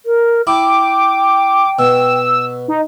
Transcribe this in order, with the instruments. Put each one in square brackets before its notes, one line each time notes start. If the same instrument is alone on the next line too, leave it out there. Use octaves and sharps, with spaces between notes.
[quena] A#4
[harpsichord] E4 [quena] G5 [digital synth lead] D6
[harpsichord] B2 [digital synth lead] E6
[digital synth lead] D#4